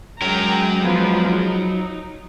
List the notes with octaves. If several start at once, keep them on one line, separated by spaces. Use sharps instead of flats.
F#3 G#3 A#4 G5 A#5
F3 G#3 B3
D#4